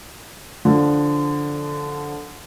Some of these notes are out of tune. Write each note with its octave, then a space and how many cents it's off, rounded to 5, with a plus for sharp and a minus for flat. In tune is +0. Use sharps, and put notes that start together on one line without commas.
D3 -5 F3 +0